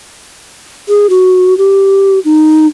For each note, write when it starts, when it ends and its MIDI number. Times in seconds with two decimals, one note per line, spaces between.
0.88 1.07 68
1.10 1.57 66
1.58 2.19 67
2.25 2.66 63